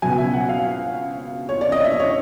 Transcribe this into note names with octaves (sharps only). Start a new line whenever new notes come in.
C#2 B2 F#3 G#5
E5
F#5
F5
C#5
D5
D#5
E5
C#5